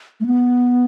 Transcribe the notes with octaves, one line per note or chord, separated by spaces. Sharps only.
A3
B3